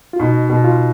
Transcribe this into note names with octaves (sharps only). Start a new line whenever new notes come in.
F4
B2 D#4
B2
F4